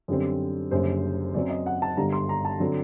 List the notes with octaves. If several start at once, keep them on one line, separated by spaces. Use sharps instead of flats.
F#2 D3 G3 C4
F#1 F#2 D3 G3 C5
F#2 F#3 C4 D5
D#5
F#5
A5
G1 G2 D3 G3 A#5
C6
A#5
A5
D3 F#3 C4